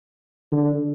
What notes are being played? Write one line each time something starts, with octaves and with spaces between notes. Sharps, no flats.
D3